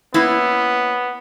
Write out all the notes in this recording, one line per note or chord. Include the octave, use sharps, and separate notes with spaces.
A#3 B3 C#4 E4